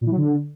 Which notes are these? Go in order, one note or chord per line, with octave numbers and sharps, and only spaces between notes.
A#2
E3
F#3
D3